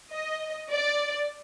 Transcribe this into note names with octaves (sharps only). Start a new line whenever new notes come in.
D#5
D5